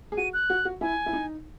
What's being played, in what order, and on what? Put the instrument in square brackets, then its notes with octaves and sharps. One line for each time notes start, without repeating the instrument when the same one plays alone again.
[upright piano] G#4
[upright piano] F#4 [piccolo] D#7
[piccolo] F#6
[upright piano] F#4
F#4
[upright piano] E4 [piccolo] G#5
[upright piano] E4
D#4